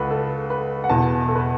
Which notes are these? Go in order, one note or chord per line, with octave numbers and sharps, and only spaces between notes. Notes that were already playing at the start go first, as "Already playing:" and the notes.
Already playing: C#2 A4 B4 F#5
A4
B4
F#5
E2 B2 A5
A4
B4